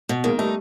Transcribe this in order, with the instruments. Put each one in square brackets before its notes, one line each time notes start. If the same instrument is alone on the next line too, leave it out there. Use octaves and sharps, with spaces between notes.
[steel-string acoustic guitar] B2
[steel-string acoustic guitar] D#3 [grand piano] G#3 A#3
[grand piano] G3 A3 [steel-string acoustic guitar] D#4